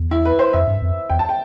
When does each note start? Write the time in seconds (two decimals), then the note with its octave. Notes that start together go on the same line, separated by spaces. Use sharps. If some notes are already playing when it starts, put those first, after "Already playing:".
Already playing: E2
0.11 E4
0.25 B4
0.39 C5
0.53 F2 E5
0.67 G2
0.82 F2
1.10 E2 G5
1.19 A5
1.29 G5